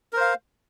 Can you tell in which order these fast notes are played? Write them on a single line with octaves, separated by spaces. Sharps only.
A#4 C5 F5